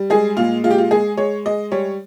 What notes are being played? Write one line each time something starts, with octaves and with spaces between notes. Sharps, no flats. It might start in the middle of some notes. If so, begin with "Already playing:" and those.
Already playing: G3
G#3 G#4
A#2 F4
G#3 F4
G4
F4
G#3 G#4
G#3 C#5
G#3 D#5
G3 C#5